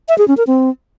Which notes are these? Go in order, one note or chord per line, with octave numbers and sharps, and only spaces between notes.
E5
G#4
C#4
A#4
C4